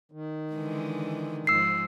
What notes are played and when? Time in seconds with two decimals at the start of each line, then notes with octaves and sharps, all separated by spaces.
0.12 D#3
0.53 D3 E3 G#3
1.47 G#2 F3 E6 C7